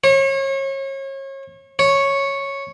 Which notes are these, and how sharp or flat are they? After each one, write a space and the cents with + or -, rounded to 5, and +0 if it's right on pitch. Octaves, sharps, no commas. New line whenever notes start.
C#5 -35
C#5 -5